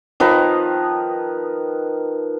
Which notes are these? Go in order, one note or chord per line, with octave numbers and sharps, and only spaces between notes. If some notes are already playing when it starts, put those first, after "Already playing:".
D#3 F3 B4 A#5